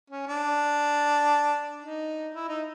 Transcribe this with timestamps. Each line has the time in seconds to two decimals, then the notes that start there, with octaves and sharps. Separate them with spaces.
0.10 C#4
0.28 D4
1.83 D#4
2.35 E4
2.48 D#4